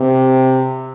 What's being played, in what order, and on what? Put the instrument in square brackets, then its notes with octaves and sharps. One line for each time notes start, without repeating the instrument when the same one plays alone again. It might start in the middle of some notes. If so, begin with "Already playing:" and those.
Already playing: [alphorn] C3